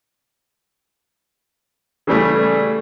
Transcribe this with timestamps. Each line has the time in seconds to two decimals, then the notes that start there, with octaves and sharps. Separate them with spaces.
2.07 C#3 E3 G3 A3